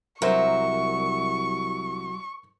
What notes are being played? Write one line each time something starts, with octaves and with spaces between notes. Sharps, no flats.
C2 F#3 A#4 C5 E5 C#6